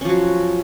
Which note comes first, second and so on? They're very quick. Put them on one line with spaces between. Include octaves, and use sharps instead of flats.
C#4 F3 F#3